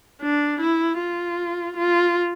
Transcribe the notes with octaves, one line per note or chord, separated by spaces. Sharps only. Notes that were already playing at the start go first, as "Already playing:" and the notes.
D4
E4
F4
F4